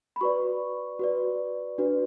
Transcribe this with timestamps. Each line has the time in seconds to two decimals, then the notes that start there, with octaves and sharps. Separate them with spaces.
0.16 B5
0.21 F#4 B4 D5 C#6
0.99 F#4 B4 D5
1.78 D4 F#4 B4 D5